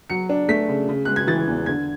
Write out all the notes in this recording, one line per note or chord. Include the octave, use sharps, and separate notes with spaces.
F#3 C#7
D4
A3 B6
C#3
C#3
G#3 F#6
G#6
E3 A6
E2
D3 G#6